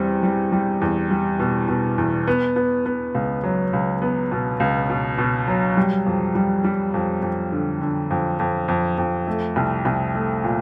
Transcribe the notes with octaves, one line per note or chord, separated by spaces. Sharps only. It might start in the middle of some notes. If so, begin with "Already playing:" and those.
Already playing: E2 G3 C4
G3
G3
E2
G3
B2
B2
E2
B3
B3
B3
C#2
F#3
C#2
B3
B2
C#2
B2
B2
F#3
G3
F2
G3
G3
F2
F2
D3
D3
F2
F2
F2
F2
A3
C2
C2
A3
A#2